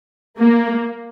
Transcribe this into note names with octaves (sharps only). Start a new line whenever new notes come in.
A#3